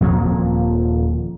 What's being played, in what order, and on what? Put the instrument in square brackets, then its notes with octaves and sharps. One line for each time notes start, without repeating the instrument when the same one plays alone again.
[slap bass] D#1 F3 A#3 C4